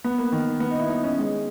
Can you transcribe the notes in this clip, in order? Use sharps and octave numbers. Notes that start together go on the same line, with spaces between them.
B3
A#3
D#3
B3
D#4
E4
D#4
C#4
G#3